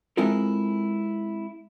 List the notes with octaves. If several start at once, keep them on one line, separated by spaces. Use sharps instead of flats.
G#3 C4 E4 F4 A4 A#4